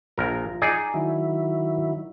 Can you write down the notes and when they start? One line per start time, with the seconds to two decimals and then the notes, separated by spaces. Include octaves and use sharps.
0.18 A#1 F3 A#4
0.62 D#4 G#4 D5
0.94 D#3 F#3 E4